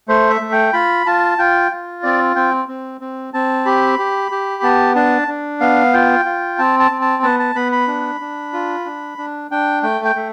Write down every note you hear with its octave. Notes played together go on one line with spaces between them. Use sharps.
A3 C5
E5
A3
G5
F4 B5
F4 A5
F4 G5
F4
C4 D5
C4 G5
C4
C4
C4 A5
G4 B5
G4
G4
B3 A5
D4 A5
D4
B3 F5
F4 G5
F4
C4 A5
A5
C4
A5
B3 A5
A5
B3 B5
B5
D4
D4
F4
D4
D4
D4 G5
A3 G5
G5
A3